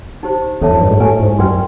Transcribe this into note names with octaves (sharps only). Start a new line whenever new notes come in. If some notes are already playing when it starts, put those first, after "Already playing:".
D#4 G4 C5
E2 A4 C#5 E5 A5
F2
G2
G#2
A2 G4 B4 E5 G#5 C#6
G#2
F#2 B4 D5 G5 C6